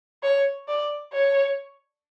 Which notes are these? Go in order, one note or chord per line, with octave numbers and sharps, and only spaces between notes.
C#5
D5
C#5